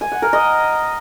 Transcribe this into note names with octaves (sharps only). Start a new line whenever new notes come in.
G#5
F#5
A#4
D#5